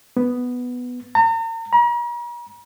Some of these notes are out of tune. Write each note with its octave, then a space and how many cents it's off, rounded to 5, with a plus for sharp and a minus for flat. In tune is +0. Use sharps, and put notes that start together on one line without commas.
B3 +0
A#5 -40
A#5 +45